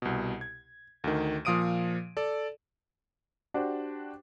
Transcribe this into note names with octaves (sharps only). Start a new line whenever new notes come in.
C2 B2
G#6
D2 D#3
A#2 F3 F5 D#6 D7 D#7
A4 D5
D4 F#4 G4 C5